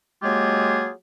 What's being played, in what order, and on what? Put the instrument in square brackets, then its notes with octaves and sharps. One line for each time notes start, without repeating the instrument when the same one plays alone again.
[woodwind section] F#3 G#3 A#3 F4 G4 G#4